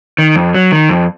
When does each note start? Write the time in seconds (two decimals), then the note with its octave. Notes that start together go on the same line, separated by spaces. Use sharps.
0.18 D#3
0.36 F2
0.54 F#3
0.72 D#3
0.89 F2